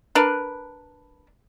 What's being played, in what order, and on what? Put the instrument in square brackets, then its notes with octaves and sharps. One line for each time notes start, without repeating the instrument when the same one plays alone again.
[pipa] D4 A#4 B4